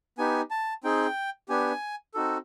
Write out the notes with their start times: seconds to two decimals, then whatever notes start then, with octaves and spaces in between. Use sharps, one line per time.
0.18 B3 D#4 G4 G#5
0.51 A5
0.84 C4 D#4 G#4 G5
1.49 B3 D4 G4 G#5
2.14 C4 D#4 F#4 A4